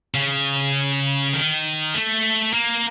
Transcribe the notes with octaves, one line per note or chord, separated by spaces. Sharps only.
C#3
D#3
A3
A#3